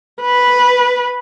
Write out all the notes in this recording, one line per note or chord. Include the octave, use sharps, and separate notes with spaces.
B4